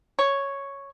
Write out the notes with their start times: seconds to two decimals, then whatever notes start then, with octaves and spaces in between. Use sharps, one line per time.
0.19 C#5